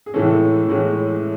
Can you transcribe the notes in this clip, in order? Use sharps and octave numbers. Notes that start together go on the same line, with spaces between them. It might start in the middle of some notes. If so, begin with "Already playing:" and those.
G#4
A2 E3 G#3 C#4 A4
A2 E3 G#3 C#4